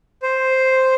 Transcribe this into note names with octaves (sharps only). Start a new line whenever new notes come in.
C5